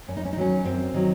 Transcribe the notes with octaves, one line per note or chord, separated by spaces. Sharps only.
F#2 C#4
D#4
C#4
D#4
D#3 F#3 C#4
F#2 C4
D#3 F#3